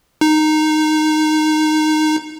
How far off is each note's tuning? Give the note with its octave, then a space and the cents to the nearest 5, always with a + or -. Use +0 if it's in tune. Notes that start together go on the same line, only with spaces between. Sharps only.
D#4 -10